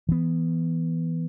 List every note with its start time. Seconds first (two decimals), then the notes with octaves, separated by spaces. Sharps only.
0.09 E3 B3